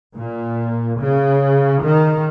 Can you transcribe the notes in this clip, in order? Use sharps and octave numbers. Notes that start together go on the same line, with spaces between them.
A#2
C#3
D#3